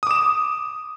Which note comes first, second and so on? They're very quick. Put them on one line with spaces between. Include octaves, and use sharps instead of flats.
D#6 D6 E7